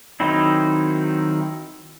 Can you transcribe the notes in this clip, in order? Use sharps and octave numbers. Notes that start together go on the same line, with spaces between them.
D#3 F#3 C4 D#4 E4